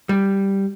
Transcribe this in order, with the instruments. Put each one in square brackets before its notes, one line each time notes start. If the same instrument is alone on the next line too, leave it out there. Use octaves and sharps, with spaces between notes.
[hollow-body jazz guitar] G3